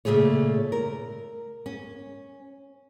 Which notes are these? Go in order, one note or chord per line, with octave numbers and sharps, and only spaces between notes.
A#2 C#3 A3 G#4 C#5
A#4
C#4